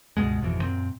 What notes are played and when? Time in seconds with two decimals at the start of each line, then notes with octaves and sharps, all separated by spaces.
0.17 C#2 G2 B2 G#3
0.41 G#1 F2 B2 E3
0.62 F#2 A#2 C4